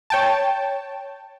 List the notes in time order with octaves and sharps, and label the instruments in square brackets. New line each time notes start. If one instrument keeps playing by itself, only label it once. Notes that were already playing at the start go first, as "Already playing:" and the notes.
[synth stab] C#5 G5 A5